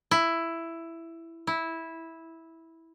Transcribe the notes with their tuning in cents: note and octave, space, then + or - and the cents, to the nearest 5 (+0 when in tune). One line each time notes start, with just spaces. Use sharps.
E4 +10
E4 -10